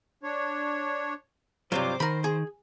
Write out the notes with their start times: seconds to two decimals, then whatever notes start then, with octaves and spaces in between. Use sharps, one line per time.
0.23 D4 C#5
1.72 G2 C3 F#3 F4 C5 D6
2.00 D#3 A#4 C5 B5
2.24 G#4